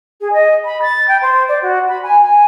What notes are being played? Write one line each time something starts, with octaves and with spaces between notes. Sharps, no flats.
G#4
D#5
B5
A6
G5
C5
D5
F#4
B5
G#5
G#5